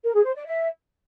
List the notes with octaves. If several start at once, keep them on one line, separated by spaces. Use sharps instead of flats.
A#4
G#4
C5
D5
E5